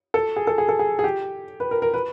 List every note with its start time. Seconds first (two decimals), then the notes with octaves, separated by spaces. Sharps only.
0.14 A4
0.36 G#4
0.47 A4
0.58 G#4
0.69 A4
0.79 G#4
0.99 G#4
1.04 G4
1.60 B4
1.71 A#4
1.82 A#4
1.94 B4